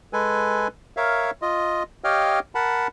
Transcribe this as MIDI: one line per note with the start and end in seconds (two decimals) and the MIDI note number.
0.13 0.68 56
0.13 0.68 69
0.13 0.68 71
0.13 0.68 80
0.97 1.31 70
0.97 1.31 73
0.97 1.31 76
0.97 1.31 77
1.42 1.83 65
1.42 1.83 75
2.04 2.39 67
2.04 2.39 73
2.04 2.39 75
2.04 2.39 77
2.04 2.39 79
2.04 2.39 89
2.55 2.87 70
2.55 2.87 78
2.55 2.87 81
2.55 2.87 83